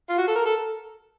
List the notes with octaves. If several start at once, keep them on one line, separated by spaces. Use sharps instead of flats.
F4
F#4
A4
A#4
A4